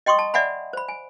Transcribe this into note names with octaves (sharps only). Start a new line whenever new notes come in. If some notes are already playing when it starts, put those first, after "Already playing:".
D#5 G5 C6 C#6 D#6
A5
D5 E5 F#5 G#5 B5
C5 B5
G#5